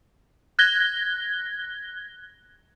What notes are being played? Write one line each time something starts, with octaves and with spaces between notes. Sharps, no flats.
F#6 G#6 A#6 G7